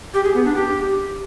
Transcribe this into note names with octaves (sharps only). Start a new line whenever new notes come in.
G4
G#4
B3
D4
G4